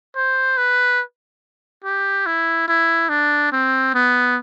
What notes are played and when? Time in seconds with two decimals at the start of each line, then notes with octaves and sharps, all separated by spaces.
0.15 C5
0.57 B4
1.84 G4
2.26 E4
2.68 E4
3.09 D4
3.52 C4
3.94 B3